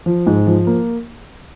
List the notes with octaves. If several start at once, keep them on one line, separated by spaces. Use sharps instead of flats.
F3
G#2
F3
A#3